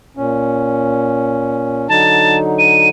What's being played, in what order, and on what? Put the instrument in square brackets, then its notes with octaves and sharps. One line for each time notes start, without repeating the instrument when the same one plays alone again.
[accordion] A#2 C#4
[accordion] D3 F#3 D#4 [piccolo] A5
[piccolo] D#7